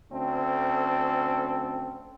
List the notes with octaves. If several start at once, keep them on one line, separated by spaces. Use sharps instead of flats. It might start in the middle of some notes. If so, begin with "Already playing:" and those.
D2 C4 C#4 A4